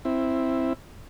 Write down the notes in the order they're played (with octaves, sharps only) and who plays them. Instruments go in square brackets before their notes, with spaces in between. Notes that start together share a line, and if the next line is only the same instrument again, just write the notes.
[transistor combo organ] C4 E4